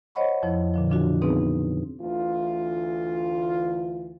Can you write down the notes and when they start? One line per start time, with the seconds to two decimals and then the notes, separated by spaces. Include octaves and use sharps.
0.15 C5 C#5 D#5 F#5 B5 C#6
0.42 F2 F3 E4
0.74 A#2 D3 F3
0.89 C#3 E3 F3 D4 F4 F#4
1.21 B3 C4 D#4 G#4 B4
2.01 D2 E3 F4